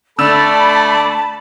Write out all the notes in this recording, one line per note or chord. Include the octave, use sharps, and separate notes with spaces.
D3 A3 D5 A5 B5 E6 E7